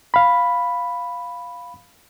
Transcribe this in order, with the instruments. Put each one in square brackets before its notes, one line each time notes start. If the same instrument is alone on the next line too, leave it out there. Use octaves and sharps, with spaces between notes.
[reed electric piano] F5 B5